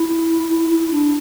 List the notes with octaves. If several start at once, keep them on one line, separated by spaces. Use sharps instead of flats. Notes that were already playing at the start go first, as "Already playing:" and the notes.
Already playing: E4
E4
E4
D4